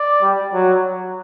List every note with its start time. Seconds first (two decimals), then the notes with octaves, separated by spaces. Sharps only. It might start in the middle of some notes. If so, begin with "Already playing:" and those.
Already playing: D5
0.22 G3
0.53 F#3